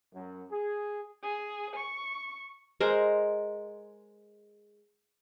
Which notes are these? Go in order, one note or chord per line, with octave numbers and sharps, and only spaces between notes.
F#2
G#4
G#4
C#6
G#3 A#4 C5